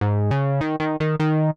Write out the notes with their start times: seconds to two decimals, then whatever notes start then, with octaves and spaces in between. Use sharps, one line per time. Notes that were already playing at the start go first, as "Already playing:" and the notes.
0.01 G#2
0.31 C#3
0.61 D#3
0.80 D#3
1.00 D#3
1.20 D#3